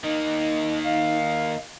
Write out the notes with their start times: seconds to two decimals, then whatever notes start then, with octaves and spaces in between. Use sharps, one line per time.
0.04 D#3 A#3 D#4 D#5
0.85 D#5 F5